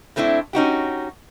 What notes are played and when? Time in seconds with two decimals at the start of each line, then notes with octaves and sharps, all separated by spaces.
0.16 A2 A3 C4 D4 E4
0.53 C#4 D#4 F#4 G4